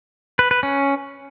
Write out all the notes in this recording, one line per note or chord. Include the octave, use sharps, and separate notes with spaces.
B4
B4
C#4